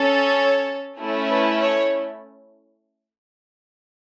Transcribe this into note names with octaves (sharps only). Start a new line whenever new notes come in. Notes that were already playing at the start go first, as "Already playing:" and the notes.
Already playing: C#4 A4
C#5
A3 C#4 E4
B4
C#5